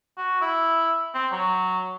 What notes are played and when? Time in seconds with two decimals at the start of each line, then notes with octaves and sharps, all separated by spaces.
0.18 F#4
0.41 E4
1.14 C4
1.32 F#3